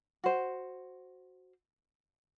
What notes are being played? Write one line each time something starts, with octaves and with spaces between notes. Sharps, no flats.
F#4 C5